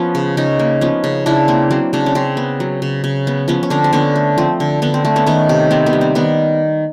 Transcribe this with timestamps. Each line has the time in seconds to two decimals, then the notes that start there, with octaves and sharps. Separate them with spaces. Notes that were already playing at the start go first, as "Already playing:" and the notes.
Already playing: F3 B3 C#4
0.15 C#3
0.37 C#3 C#4 D#4
0.59 A#3
0.81 F3 B3 C#4
1.04 C#3
1.26 C#3 D4 E4
1.48 A#3 C4
1.71 F#3 C4
1.93 C#3 C4 D4
2.06 C#4
2.15 C#3 C4
2.37 B3
2.60 F#3
2.82 C#3
3.04 C#3
3.27 B3
3.48 F3 B3 C#4
3.63 C#4
3.70 D3 C4 D4
3.84 C4
3.93 D3 B3 C#4
4.16 A3
4.38 F3 C4
4.60 D3
4.82 D3 B3
4.94 C4
5.05 A3 C4
5.16 B3 C#4
5.26 D#3 B3 C#4
5.49 C3
5.71 B3 C4
5.86 B3
5.93 G3
6.01 C4
6.15 D#3 B3